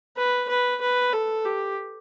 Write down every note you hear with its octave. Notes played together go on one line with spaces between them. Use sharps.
B4
B4
B4
A4
G4